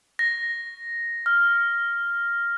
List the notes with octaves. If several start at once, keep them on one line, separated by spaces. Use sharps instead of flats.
A#6
F6